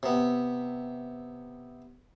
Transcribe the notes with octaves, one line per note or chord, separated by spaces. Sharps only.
C3 B3